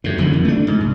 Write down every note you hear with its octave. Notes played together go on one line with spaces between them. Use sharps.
F#2 A2
F#1 D3 D#3 F3
F2
A3 D4
G#2
C2